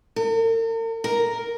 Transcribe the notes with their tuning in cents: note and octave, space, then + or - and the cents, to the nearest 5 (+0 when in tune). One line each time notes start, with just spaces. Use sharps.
A#4 -45
A#4 +0